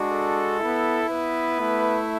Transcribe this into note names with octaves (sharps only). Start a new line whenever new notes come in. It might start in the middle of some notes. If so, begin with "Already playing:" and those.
Already playing: G#3 D4 F#4
A4
B3 E4
B3 B4
A3 E4